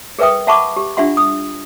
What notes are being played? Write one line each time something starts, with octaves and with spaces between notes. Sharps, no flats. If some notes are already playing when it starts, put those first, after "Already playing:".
G#4 A#4 B4 E5 G5 D#6
E5 F#5 A5 B5 C#6 D6
G4
D4 F4 G4 E5 F#5 C6
D#6